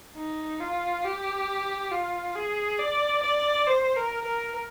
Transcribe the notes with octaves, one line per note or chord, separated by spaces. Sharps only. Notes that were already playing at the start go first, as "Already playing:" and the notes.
D#4
F4
G4
F4
G#4
D5
D5
C5
A#4
A#4